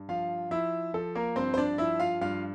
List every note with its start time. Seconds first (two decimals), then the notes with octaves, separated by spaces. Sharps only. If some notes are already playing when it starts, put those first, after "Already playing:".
Already playing: G2
0.09 F3 F4 F5
0.51 F3 E4 E5
0.94 F3 A4
1.15 A#3 A#4
1.36 G2 C4 C5
1.54 C5
1.57 D4 D5
1.78 F3 E4 E5
2.00 F4 F5
2.21 G2 F4 F5